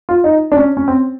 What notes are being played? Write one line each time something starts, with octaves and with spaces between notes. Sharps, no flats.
F4
D#4
D4
C#4
C#4
C4